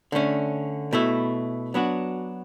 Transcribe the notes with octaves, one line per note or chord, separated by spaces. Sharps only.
D3 A3 C#4
B2 A3 E4
F#3 B3 D4 F#4